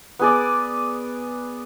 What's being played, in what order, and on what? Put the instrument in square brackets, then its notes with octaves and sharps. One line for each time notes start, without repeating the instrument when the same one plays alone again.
[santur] B3 G#4 D5